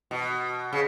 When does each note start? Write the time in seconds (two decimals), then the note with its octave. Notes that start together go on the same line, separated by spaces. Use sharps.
0.11 B2
0.73 C#3